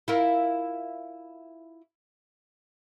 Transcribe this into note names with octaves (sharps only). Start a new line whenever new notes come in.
E4 F4 A#4